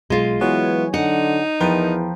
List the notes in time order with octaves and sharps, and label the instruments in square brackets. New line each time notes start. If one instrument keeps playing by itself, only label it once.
[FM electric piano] B1 [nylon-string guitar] G#3 F4
[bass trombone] E3 [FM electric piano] F#3 C#5 G#5 [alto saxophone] B3
[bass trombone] D3 [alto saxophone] D#4 [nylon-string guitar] F#5
[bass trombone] E2 [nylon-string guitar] F3 [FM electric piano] A#4 B4 G5